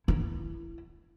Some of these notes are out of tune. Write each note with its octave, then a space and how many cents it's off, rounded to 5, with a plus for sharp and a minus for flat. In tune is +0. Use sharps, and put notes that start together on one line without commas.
E4 +20